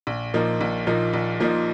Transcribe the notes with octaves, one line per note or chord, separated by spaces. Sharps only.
A#1
A#2 F3 A#3 D#4
A#1
A#2 F3 A#3 D#4
A#1
A#2 F3 A#3 D#4